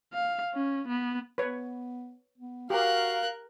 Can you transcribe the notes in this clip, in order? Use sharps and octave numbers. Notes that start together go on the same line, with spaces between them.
F5
C#4
B3
B3 B4 C#5
B3
F#4 G4 A#4 F5 F#6